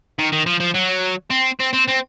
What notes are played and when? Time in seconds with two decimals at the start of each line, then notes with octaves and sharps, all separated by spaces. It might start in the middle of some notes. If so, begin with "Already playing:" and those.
0.19 D#3
0.32 D#3
0.46 F3
0.61 F3
0.75 F#3
1.31 C4
1.60 C4
1.73 C4
1.88 C4